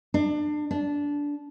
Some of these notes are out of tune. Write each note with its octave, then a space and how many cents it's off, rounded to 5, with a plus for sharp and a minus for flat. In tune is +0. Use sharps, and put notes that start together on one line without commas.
D4 +30
D4 -15